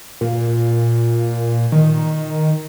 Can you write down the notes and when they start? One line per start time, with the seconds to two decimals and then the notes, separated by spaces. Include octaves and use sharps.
0.21 A#2
1.72 D#3